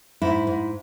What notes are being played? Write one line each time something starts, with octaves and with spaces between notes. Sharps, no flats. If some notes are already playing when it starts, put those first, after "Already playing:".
G#2 E4
G#2